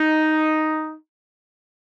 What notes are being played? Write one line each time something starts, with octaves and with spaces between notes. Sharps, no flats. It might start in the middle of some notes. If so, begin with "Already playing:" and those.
Already playing: D#4